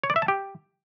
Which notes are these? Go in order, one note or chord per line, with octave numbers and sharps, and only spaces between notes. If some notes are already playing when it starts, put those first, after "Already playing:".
C#5
D5
E5
A5
G4